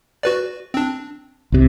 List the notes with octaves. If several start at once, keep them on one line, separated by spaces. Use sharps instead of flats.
F#4 B4 D5
C4 D4
C2 C3